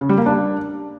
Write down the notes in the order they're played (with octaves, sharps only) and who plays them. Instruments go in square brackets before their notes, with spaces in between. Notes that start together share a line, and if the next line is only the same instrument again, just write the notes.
[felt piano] C#3
G3
A#3
D4